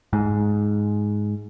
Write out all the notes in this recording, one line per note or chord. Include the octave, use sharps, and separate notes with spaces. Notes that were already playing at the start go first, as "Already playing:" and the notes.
G#2